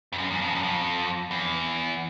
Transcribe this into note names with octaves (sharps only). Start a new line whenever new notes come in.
F2
F#2
E2
F2
F#2
F2
E2